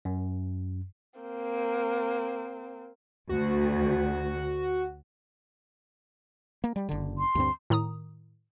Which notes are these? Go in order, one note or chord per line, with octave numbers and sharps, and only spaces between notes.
F#2
A#3 C4
D2 F#4
A#3
G3
F#1 D3
C6
D2 G2 C4
A2 D#3 A#5 D#6